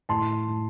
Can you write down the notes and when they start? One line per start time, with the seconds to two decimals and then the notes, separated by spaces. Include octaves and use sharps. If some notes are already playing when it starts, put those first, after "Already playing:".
0.09 A2 A5 C6
0.48 A2